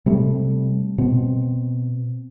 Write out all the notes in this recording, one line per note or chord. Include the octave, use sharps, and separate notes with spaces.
C3 G3 A3
B2 C4